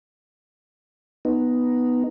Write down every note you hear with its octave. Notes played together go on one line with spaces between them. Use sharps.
B3 D#4